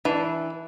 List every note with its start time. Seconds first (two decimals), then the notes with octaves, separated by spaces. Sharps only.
0.05 E3 D4